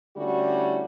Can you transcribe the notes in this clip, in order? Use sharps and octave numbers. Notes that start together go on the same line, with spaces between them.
D3 G3 A3 C#4 E4 F#4